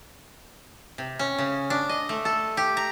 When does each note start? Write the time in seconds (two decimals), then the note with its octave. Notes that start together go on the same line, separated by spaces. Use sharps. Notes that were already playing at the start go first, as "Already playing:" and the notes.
0.98 C3
1.19 C#4
1.38 C#3
1.70 D4
1.89 D#5
2.09 A3
2.25 A4
2.57 G4
2.77 A#5